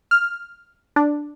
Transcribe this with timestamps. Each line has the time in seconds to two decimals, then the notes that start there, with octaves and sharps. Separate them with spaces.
0.11 F6
0.96 D4